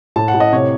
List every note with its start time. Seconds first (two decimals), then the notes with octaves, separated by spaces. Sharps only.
0.16 A2 A5
0.28 F#5
0.34 A2
0.40 D#5
0.53 C3 C#5